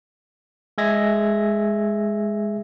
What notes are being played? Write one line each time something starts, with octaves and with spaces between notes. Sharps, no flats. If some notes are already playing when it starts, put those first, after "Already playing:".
G#3 G#4 E5 G#6 A#6